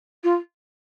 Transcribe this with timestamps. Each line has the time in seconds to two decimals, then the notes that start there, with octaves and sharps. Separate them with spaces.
0.24 F4